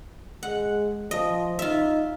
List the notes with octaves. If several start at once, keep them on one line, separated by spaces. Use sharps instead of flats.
G#3 F#5
F3 D#5
D#4 F4 E5